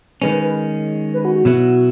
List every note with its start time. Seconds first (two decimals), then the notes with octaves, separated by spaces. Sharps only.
0.22 D#3 G#3 C#4 B4
0.32 B4
0.43 B4
1.14 B4
1.25 F#4
1.35 F#4
1.45 B2 F#3 B3 E4